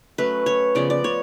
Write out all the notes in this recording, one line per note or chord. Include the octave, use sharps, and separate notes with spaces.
F#3 A3 C#4 B4
C#5
C#3 F3 B3 D5
D5
C#5